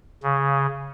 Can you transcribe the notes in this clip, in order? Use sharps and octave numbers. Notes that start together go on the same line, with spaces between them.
C#3